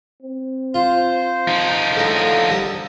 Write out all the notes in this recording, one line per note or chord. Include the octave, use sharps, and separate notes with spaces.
C4
F4 C5
F3 D#4
A2 D3 A4 F5 A#5 D#6
G3 A4 A5